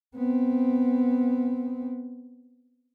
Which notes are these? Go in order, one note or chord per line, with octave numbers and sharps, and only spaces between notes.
B3 C4